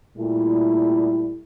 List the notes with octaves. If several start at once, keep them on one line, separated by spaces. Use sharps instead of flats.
A#2 G3 A3 E4